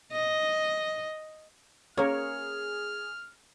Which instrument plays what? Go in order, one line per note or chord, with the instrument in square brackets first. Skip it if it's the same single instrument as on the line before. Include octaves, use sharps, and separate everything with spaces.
[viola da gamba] D#5
[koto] A#3 C#4 [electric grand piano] G#4 [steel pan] A#4 C#5 [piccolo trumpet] F6